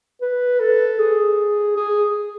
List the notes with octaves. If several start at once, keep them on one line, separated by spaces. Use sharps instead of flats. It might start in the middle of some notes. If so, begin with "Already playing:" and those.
B4
A4
G#4
G#4